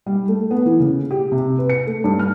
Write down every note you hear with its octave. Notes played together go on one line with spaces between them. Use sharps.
G3
A3
B3
E3
C#3
G4
C3
B4
C#7
A3
G2
F6